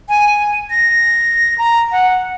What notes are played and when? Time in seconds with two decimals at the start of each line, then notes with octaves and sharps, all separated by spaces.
0.09 G#5
0.70 A#6
1.58 A#5
1.92 F#5